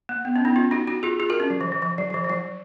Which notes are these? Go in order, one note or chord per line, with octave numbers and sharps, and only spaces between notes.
A#3
B3
C#4
B3 D#4
C#4 F4
D#4 F#4
D#4 F#4
F4 G#4
F4 G#4
F#4 A#4
C#4
F#3
F3
F3
F3
F#3
F#3
F3
F3
F#3